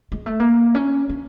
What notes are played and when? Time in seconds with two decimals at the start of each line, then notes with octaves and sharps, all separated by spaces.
0.12 G#3
0.26 A3
0.40 A#3
0.75 C#4
1.09 D4